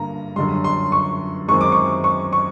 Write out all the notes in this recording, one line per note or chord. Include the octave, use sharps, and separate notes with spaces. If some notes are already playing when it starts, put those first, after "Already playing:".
Already playing: G2 D3 A#3 A#5
F#2 D3 G3 C6
C6
C#6
F#2 D#3 G#3 C4 C#6
D6
C#6
C#6
C#6